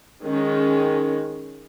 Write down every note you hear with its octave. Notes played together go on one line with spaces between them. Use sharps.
D#3 G#3 C#4